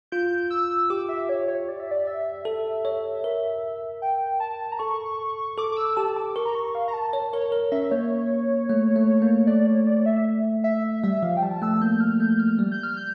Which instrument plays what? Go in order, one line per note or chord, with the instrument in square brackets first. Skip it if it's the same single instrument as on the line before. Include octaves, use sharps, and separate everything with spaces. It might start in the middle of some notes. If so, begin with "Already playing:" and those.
[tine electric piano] F4 [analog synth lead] G6
[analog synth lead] E6
[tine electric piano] G4 [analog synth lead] D6
[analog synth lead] E5
C#5
C#5
D5
E5
D5
E5
[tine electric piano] A4
C#5
A#4
[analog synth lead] G5
A5
A#5
[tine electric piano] A4 [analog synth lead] C#6
[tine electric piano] A4 [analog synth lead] D6
[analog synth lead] D6
E6
[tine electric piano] G4 [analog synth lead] A5
[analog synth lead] D6
[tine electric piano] A#4 [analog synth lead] C#6
[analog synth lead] A#5
C#6
F5
A#5
A5
[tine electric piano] C#5
[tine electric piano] A#4 [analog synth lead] C#5
[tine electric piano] A#4
[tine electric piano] C#4 [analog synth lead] E5
[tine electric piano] A#3 [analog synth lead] C#5
[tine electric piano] A3
A3
A#3
[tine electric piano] A3 [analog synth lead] D5
[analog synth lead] C#5
D5
E5
E5
[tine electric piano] G3 [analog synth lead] E5
[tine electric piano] F3 [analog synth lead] F5
[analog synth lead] G5
[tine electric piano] G3 [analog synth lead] A5
[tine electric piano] A3 [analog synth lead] E6
[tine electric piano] A#3 [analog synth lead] G6
[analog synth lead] F6
[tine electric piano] A3 [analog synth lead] G6
[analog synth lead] F6
[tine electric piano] G3
[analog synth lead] G6
F6
G6